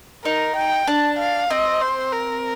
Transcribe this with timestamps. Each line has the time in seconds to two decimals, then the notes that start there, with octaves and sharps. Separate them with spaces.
0.25 D#4 A#4
0.56 G5
0.87 D4 A5
1.18 F5
1.50 C4 D#5
1.81 C5
2.12 A#4